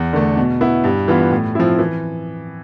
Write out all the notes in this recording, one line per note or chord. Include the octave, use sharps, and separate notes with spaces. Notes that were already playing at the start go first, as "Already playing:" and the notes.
Already playing: E2
D3 A3
B2
B3 E4
G2
E3 B3 F4
A2
F3 C4 E4
E3